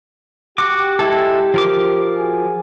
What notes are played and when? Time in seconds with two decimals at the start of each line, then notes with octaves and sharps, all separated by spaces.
0.58 F#4 G4 D6
0.99 G#3 E4 A4
1.54 F3 A#4 D6
2.18 F#4 G#4 G#5